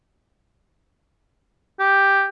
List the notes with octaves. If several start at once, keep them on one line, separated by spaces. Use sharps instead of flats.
G4